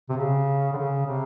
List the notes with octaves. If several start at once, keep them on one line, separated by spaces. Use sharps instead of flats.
C3
C#3
D3
C#3
C3